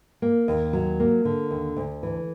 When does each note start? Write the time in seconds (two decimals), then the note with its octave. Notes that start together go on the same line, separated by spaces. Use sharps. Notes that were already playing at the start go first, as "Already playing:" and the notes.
0.22 A#3
0.48 D#2
0.73 F#3
1.00 A#3
1.25 D3
1.51 D#2
1.77 D2
2.03 E3